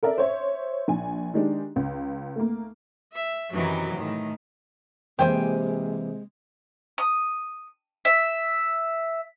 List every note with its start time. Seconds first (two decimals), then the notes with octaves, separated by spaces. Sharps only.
0.03 A4 A#4 D5 E5
0.18 C5 C#5 E5
0.88 A#1 G#5
1.34 D#3 G#3 D4 G4
1.76 C#2
2.36 A3 A#3
3.14 E5
3.53 F#2 C3 D#3 E3 F#3
3.97 A2 D#3
5.19 C3 E3 G#3 A#3 G4 C5 G5 G#5
6.98 D#6
8.05 E5